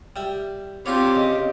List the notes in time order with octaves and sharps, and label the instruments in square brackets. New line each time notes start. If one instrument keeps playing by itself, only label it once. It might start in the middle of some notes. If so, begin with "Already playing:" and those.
[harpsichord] G3 E5
[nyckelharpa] C4 G4 [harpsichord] D4 F4 C#5 [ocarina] D6
[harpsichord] C#3 [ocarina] D#5